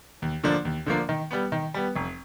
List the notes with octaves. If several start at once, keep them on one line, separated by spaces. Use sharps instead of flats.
D#2
D3 F3 A#3 D4
D#2
D3 F3 A#3 D4
D#3
G3 B3
D#3
G3 B3
F1